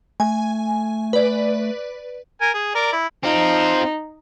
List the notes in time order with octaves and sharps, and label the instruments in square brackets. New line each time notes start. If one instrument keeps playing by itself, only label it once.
[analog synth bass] A3 [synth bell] G#5
[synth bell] B4 D5
[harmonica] A#4 G#5
G#4
A#4 D5
E4
[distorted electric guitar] C4 F4 [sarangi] D#4